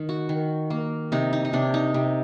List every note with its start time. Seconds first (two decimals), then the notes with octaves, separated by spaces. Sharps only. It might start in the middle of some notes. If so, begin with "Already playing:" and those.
Already playing: D#3 D#4
0.09 F#4
0.29 D#3
0.70 A#3
1.12 C3 D#4
1.33 D#4
1.45 D#4
1.53 C3 D4
1.74 D#4
1.94 C3